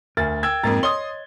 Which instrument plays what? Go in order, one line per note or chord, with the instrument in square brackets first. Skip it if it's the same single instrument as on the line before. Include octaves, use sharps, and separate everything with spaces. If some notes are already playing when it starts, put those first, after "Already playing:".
[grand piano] D2 [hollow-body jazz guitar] A#4 G#5 [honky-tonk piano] A6
[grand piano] G5 E6 G#6
[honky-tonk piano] F2 A#3 A6 [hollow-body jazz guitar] G#2 A#5
[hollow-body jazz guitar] C#5 D#5 [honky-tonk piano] C6 D#6 [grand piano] G7